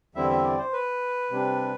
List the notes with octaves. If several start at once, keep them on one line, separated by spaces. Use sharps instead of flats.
E2 D3 G3 C4 E4 E5
E5
D5
C5
B4
C3 G3 D4